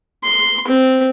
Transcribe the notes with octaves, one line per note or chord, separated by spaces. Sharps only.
C6
C4